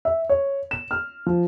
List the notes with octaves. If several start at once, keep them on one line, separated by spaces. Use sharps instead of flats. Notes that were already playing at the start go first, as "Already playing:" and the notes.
E5
C#5
E7
F6
F3